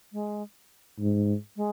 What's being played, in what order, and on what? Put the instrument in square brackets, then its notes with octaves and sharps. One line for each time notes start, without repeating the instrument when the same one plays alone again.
[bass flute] G#3
[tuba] G#2
[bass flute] G#3